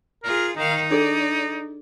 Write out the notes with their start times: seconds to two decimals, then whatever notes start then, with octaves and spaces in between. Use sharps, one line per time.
0.24 F4 G#4 A#4
0.56 D#3 D#4 F5
0.91 D4 G#4 A4 D5